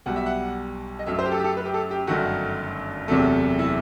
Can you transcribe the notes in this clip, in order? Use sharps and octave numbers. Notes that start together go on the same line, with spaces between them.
B1 B2 G3 F#5
E5
F#5
D#5
F#2 F#3 A3 E5
C5
G4
A4
G4
A4
B4
G4
A4
G4
G1 F#2 D#3 A3 F#4
F#1 E2 C3 F#3 A3
E4